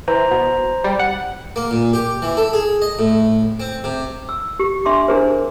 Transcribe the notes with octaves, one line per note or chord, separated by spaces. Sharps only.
E3 C5 A#5
B2
G3
F#5
A#3
A#2
G4
E3
A4
G#4
D#5
A2
C4
C3
E6
G4
D4 E5 C6 D6
D4 E4 G#4 A#4 C5